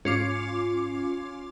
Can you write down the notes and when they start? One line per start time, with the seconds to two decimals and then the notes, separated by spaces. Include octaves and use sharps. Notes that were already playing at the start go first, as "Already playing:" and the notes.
0.05 G#2 C#4 F4 D6